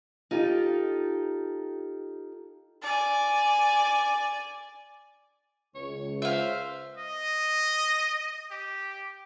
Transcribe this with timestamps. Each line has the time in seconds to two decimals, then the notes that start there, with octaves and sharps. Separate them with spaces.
0.31 D#4 F4 G4 A4
2.82 D5 G#5
5.75 C#2 C#5
6.22 C5 E5 F5
6.98 D#5
8.51 G4